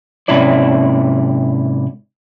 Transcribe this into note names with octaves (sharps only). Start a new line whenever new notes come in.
G#2 C3 C#4 E4 D5